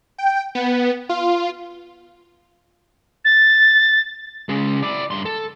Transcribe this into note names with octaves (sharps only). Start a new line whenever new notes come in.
G5
B3
F4
A6
C#3 G#3
E4 D5
G2 C6
A4